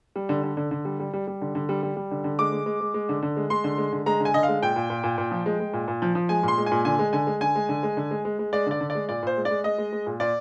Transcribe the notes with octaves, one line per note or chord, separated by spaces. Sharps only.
G3
D3
D3
D3
D3
G3
G3
G3
G3
D3
D3
G3
G3
G3
D3
D3
G#3 D6
G#3
G#3
G#3
G#3
D3
D3
G#3
G#3 C6
D3
G#3
D3
G#3 A#5
D3
G#5
D3 D#5
F5
G#3
A#2 G5
A#2
A#2
A#2
A#2
F3
G#3
G#3
A#2
A#2
F3
F3
G#3 G#5
A#2 C6
G#3
G#5
A#2
D3 G#5
G#3
D3 G#5
G#3
D3 G#5
G#3
D3
G#3
D3
G#3
G#3
G#3
G#3 D5
D3 D5
D3
D5
G#3
A#2 D5
A#2 C5
G#3
D5
G#3
G#3 D#5
G#3
G#3
A#2
A#2 D5